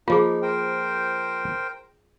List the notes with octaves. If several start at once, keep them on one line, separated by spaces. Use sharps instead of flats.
F3 A#3 D#4 F4 G#4
A#4 C5 G5